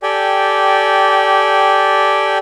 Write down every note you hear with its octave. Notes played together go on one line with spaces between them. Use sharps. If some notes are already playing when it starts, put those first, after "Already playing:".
G4 A4 D5 G5 G#5